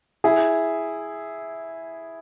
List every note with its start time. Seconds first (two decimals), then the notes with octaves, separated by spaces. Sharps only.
0.24 E4 G#4